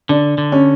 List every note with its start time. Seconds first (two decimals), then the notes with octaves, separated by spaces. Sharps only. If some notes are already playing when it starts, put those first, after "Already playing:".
0.09 D3 D4
0.38 D3
0.52 C#4